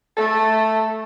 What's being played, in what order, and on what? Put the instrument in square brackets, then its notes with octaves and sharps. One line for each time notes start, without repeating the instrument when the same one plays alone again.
[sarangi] A3 [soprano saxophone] A4